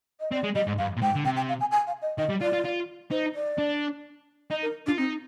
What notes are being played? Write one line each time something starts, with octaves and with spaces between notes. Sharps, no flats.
D#5
C4 D5
G#3
G3 D#5
G#2
G2 F5
A#2
G#2 G5
D3
C3 G5
G5
F5
G#5
G#5
F5
D#5
D#3 D#5
G3
F4 D5
F4
F4
D#4 C5
D5
D4
D#4 D#5
A#4
D4 F4
C4 D#4